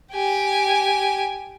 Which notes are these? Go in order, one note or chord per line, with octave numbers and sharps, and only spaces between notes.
G4 G#5